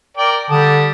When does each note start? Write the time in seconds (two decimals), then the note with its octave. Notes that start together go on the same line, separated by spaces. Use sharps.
0.17 A#4 D5 G5
0.50 D3 G3 A5 D#6